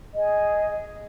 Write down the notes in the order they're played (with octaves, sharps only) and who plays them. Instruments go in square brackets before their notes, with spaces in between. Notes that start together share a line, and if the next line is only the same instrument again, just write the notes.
[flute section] G#4 D#5